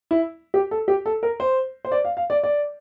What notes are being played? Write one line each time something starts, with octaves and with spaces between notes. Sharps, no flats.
E4
G4
A4
G4
A4
A#4
C5
C5
D5
F5
F5
D5
D5